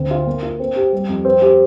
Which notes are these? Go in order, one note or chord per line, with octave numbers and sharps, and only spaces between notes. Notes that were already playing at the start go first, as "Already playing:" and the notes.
Already playing: D2 C4
F4
A#3
F4
C4
G4
G3
F2
C4
G4